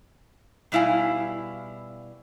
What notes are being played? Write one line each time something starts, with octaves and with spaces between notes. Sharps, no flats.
B2 G3 E4 F5 G#5